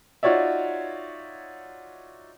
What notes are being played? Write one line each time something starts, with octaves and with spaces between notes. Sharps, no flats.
D#4 F4 F#4 C#5 D5 E5